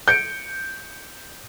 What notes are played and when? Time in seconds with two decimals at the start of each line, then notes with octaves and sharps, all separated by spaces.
0.08 G6 C#7 D7